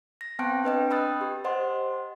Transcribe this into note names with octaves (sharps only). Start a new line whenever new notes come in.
A#6
B3 C4 G5 A5 F#6 D7
D4 B4 D#5 G5
G5 B5 D#6 E6 F#6 A6
G4
C5 D#5 F#5 C6